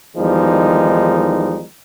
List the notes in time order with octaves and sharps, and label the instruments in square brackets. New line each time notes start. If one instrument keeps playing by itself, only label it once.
[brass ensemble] E2 D#3 F3 G3 G#3 D#4